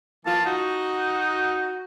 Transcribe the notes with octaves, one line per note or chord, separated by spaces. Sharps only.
E3 A#3 F4 A5
D#4 F#4